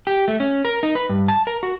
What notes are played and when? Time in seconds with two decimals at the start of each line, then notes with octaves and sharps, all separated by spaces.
0.07 G4
0.28 A3
0.40 C#4
0.65 A#4
0.83 D#4
0.95 B4
1.09 G2
1.28 A5
1.47 A#4
1.63 F#4